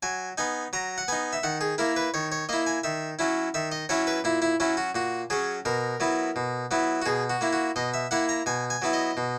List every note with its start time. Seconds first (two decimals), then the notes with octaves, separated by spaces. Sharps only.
0.03 F#3 G#5
0.38 B3 D#4 G#5
0.73 F#3 A#5
0.98 F#5
1.08 B3 D#4 G#5
1.33 E5
1.43 D#3 F#5
1.61 G#4
1.78 A#3 E4 A#4
1.96 B4
2.14 D#3 C#5
2.32 C#5
2.49 A#3 E4 D#5
2.67 G#5
2.83 D#3 E5
3.19 F#3 C#4 E4
3.54 D#3 E5
3.72 D#5
3.89 F#3 C#4 E4 C#5
4.07 B4
4.24 A#2 E4
4.42 E4
4.60 F#3 C#4 E4
4.77 F#4
4.95 A#2 F#4
5.30 F#3 C#4 G#4
5.65 B2 A#4
6.00 F#3 B3 E4
6.36 B2
6.71 F#3 B3 E4
7.02 F#4
7.06 B2 G#4
7.30 F#4
7.41 A#3 E4
7.53 F#4
7.76 B2 D#5
7.94 E5
8.11 A#3 E4 F#5
8.29 A#5
8.46 B2 G#5
8.70 G#5
8.82 F#3 B3 E4
8.93 D#5
9.17 B2